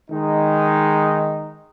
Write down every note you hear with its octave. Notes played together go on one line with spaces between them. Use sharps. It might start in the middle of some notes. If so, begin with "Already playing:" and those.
D#3 G#3 D#4